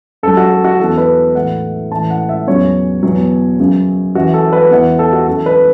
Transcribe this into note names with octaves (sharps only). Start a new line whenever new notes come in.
F#2 F#3 A4
F#4
A4
F#4
E2 E3 A4
B4
A2 E3 F#5
A2 E3 A5
F#5
E5
E2 C#3 F#3 C#5
E2 B2 F#3
F#2 C#3 F#3
F#2 E3 F#4
A4
B4
E2 E3 F#5
A4
F#4
F#2 E3 A4
B4